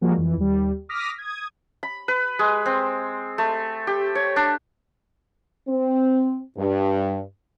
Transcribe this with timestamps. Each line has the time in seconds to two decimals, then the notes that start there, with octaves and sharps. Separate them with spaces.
0.01 F3 G3 G#3 A#3 F#4
0.17 F2 E3
0.37 D#2 G3
0.89 D6 D#6 F6 A#6 B6
1.18 D#6 G#6
1.83 B5
2.08 B4
2.39 G#3
2.66 C4
3.38 A3
3.87 G4
4.15 C#5
4.36 D4
5.68 C4
6.57 G2